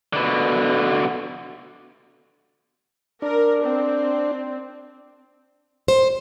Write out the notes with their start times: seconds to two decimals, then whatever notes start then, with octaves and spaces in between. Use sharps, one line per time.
0.13 B2 D3
3.22 D4 A#4
3.63 C4
5.88 C5